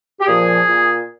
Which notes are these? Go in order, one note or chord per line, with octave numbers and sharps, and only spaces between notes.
G4
A#2 F3 G#4
A#2